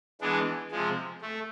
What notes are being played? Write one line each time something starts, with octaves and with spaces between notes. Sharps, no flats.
E3 G#3 B3 D4
C3 F3 G#3
A3